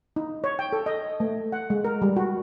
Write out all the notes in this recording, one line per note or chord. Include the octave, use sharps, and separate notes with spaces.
D#4
C#5
G5
A4
D#5
A3
F#5
G#3
A#4
G3
F#4